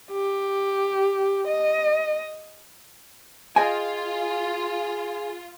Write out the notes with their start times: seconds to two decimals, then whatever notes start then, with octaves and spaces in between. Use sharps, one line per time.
0.11 G4
1.48 D#5
3.56 F4 G#4 D#5 G5 G#5